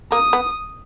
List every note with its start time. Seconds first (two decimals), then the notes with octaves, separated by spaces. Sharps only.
0.12 A#3 D#6
0.33 B3